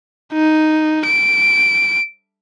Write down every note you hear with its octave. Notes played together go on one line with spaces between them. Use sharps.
D#4
D7